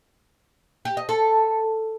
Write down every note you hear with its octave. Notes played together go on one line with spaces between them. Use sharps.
G4
D#5
A4